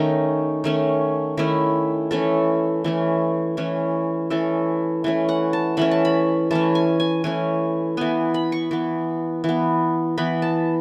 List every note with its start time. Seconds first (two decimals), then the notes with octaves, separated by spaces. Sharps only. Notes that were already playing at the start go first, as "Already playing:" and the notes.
Already playing: D#3 A3 C#4 D#4
0.64 D#3 A3 C#4
1.37 D#3 A3 C#4 E4
2.11 E3 A3 C#4 A4
2.84 E3 A3 C#4
3.57 E3 A3 C#4
4.30 E3 A3 C#4 A4
5.04 E3 A3 C#4
5.29 F#5
5.53 A5
5.77 E3 A3 C#4 B5
5.91 A5
6.05 B5
6.51 E3 A3 C#4 A5
6.75 G#5
7.00 G#5
7.24 E3 A3 C#4 G#5
7.97 E3 B3 G#5
8.34 B5
8.52 C#6
8.71 E3 B3
9.44 E3 B3
10.17 E3 B3 B5
10.42 A5